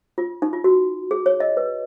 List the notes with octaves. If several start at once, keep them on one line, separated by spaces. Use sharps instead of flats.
F4
D#4
F4
F#4
G#4
C#5
D#5
B4